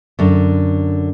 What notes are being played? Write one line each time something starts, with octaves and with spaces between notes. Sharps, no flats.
F#2 D3